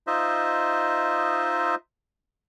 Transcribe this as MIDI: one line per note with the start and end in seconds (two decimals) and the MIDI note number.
0.07 1.75 63
0.07 1.75 65
0.07 1.75 72
0.07 1.75 75
0.07 1.75 76